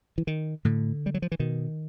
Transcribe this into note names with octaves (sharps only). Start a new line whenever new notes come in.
E3
D#3
A2 D3
G3
F#3
F3
E3
B2 D#3